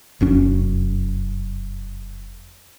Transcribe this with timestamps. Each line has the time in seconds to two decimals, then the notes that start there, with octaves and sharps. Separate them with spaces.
0.21 F1 F#2 C#4